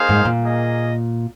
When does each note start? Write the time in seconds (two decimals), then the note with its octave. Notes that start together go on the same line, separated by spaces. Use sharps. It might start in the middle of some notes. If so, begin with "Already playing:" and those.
Already playing: A#3 D#4 G#4 C5 F5
0.09 G#2
0.25 A#2
0.41 A#3 G#4 D#5